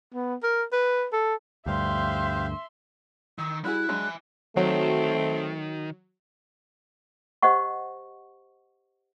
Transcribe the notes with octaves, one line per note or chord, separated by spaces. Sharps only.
B3
A#4
B4
A4
D2 G2 G4 C5 E5 F5 C6
D#3 E6
G3 E4 F#4 G#4 F#6
F#3 G#3 D4 E5 G#5
D#3 F#3 A3 C4
G4 C5 D#5 F#5 C#6